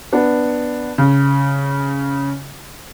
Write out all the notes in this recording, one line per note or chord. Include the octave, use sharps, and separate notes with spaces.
B3 D4
C#3